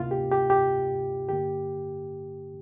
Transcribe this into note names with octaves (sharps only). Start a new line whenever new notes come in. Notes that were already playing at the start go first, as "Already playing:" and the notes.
Already playing: D2 C3 A#3 F4
G4
G4
G4
G2 D3 A#3 G4